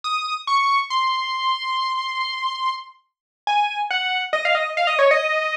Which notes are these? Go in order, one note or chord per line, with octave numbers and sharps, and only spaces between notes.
D#6
C#6
C6
G#5
F#5
D#5
F5
D#5
F5
D#5
C#5
D#5